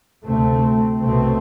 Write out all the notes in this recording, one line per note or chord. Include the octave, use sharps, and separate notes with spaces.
D2 C3 A3 C4
C2 B2 A3 C4